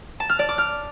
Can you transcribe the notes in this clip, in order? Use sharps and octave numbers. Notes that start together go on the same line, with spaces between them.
A5
F6
D5
D6
F6